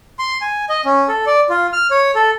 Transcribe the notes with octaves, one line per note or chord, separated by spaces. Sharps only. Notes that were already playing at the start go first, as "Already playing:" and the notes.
C6
G#5
D#5
C#4
A4
D5
F4
F6
C#5
A4